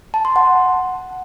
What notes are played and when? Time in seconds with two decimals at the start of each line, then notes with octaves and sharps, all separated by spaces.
0.14 A5
0.25 C6
0.36 F#5